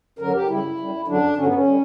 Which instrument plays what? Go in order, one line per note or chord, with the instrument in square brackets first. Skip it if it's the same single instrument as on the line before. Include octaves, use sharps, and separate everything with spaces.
[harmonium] F#2 D3 F#3 A#4
G4
F#2 C#3 G3 E4
F#2 D3 G3
F#2 D3 F#3 D4
G2 D3 F#3 C#4
B3
C#4
D3 G3